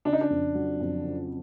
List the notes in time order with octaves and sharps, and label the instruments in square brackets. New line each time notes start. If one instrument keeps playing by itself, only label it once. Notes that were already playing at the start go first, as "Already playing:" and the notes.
[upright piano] C#3 [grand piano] D4
[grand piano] D#4
D4
[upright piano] F2
F#3
F2
C#3